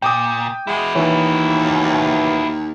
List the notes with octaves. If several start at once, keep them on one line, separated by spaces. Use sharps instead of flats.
A#2 G5 D6 D#6
G#3 E4 F#4
D#2 E3 C#5